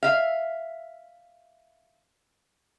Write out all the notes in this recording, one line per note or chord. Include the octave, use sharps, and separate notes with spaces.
E5 F5